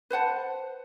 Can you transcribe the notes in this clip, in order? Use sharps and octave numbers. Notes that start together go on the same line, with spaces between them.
B4 C5 F#5 A5